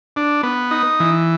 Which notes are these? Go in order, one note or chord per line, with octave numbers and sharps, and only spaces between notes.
D4
B3
D#4
E3